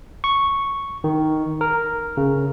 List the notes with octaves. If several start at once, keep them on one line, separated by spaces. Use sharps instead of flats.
C#6
D#3
A#4
C#3